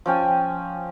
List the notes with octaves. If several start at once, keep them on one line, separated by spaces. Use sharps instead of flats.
F3 C#4 G5 G#5